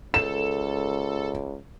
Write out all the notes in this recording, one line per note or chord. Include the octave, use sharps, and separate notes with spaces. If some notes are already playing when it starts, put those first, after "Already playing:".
C#2 A4 E7